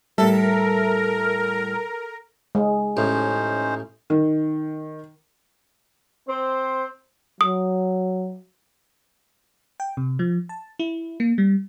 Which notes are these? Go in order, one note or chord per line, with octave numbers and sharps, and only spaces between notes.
A2 G3 A4 A#4 E5
G#3
A1 A2 C#4 D#4 C5
D#3
C4 C5
F#3 D#6
G5
C3
F3
A5
E4
A#3
G3